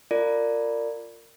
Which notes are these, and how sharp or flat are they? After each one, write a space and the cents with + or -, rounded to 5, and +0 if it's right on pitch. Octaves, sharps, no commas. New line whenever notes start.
F4 +0 A#4 -25 D5 +0